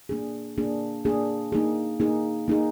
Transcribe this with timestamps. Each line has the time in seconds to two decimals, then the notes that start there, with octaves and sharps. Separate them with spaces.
0.09 A#3 D4 G#4
0.58 A#3 D4 G#4
1.05 A#3 D4 G#4
1.52 A#3 D#4 G#4
2.00 A#3 D#4 G#4
2.48 A#3 D#4 G#4